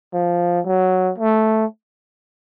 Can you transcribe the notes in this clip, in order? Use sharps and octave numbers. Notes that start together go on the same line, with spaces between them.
F3
F#3
A3